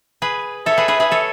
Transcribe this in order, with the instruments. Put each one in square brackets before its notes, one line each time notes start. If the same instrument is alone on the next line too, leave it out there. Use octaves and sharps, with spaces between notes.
[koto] G#4 B4
[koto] A4 C#5 [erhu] E5
[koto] G#4 B4
G#4 B4
G#4 B4
A4 C#5